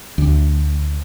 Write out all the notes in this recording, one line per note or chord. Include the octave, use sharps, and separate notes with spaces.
D2